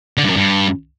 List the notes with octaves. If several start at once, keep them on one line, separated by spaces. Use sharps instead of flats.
D3
G2
F#2
G2